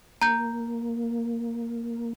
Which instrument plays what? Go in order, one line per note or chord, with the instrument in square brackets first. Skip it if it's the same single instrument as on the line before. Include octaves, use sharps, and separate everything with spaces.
[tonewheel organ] A#3 [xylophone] A#5 G6